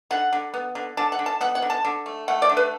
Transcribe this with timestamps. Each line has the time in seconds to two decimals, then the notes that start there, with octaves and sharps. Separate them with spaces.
0.11 D3 F#5
0.33 D3
0.54 B3
0.75 D3
0.97 D3 A5
1.12 F#5
1.19 D3
1.26 A5
1.41 B3 F#5
1.55 F#5
1.62 D3
1.70 A5
1.85 D3
2.06 A3
2.28 A3 F#5
2.42 D5
2.49 D3
2.57 B4